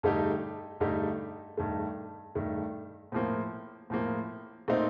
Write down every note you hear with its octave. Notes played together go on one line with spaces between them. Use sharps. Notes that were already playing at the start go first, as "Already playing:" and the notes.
G2 D3 A3 D#4 G4
G2 D3 A3 D#4 G4
G2 D#3 A3
G2 D#3 A3
A2 F3 A#3
A2 F3 A#3
A#2 A3 C4 D#4